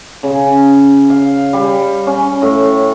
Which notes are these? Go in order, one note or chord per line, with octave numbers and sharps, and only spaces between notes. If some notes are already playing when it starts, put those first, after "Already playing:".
C#3
F5
G3
C#4
A2